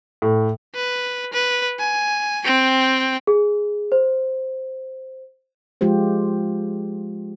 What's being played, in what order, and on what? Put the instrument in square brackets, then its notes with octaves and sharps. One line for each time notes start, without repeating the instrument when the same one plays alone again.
[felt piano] A2
[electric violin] B4
B4
G#5
C4 G5
[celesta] G#4
C5
[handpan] F3 G#3 F4 G4 C5